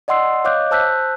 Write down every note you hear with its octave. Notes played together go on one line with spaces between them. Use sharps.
D5 D#5 F#5 C6 E6 C7
C#5 D#5 F5 D6 F#6 G6
C5 A5 E6 F#6 G6 B6